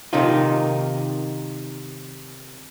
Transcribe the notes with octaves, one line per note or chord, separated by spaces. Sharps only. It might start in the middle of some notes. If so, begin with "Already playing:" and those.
C3 D#3 D#4 F4